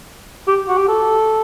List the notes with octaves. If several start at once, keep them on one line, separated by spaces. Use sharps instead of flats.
G4
F#4
G4
A4